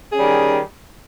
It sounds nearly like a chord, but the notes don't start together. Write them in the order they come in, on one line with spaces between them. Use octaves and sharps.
G#4 C#4 G3 D#3